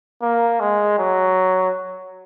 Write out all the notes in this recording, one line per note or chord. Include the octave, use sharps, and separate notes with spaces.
A#3
G#3
F#3